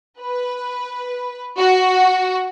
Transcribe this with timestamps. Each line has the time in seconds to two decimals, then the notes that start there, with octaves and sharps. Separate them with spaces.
0.20 B4
1.58 F#4